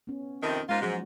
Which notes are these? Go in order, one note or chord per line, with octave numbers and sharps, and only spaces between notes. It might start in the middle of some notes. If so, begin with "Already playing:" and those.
B3 C#4
F2 C3 D#3
G#2 G#3 A#3 F4
G#2 F3 F#3 F#4